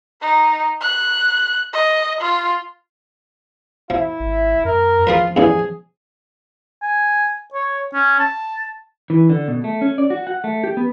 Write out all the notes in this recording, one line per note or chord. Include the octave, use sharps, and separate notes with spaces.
D#4
F#6
D#5
F4
F3 E4
G#1
F#2 A#4
F3 F4 G#4 A#4 B4
E2 G2 C#3 G#4
G#5
C#5
C#4
A5
E3
D3
B2
A3
C#4
D5
F#4
F#5
A3
G4
B3